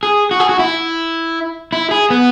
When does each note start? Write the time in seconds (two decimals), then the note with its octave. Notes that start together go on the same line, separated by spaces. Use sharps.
0.03 G#4
0.31 F#4
0.40 G#4
0.49 F#4
0.59 E4
1.73 E4
1.91 G#4
2.10 B3